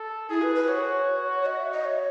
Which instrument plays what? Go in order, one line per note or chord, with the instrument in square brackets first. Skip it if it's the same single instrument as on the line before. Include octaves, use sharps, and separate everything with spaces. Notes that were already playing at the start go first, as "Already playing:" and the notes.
Already playing: [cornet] A4
[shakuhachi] E4 [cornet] G#4
[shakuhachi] B4
B4
[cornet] F#4 [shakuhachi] C#5
[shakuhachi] C#5
D#5
E5
D#5
C#5